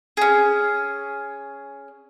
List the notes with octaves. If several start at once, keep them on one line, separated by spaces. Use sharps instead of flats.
C#4 G#4